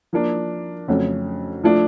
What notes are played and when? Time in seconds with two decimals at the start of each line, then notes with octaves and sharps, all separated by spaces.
0.13 F3 A#3 D4
0.88 F2 C#3 F#3 A3 C#4
1.63 F3 A3 D4 F4